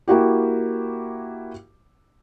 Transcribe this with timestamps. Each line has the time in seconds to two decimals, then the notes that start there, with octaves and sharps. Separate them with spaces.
0.08 A#3 E4 F#4 G4